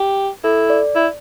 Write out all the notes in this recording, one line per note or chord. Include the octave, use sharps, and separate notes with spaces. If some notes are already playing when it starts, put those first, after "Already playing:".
Already playing: G4
E4 A4
D5
E4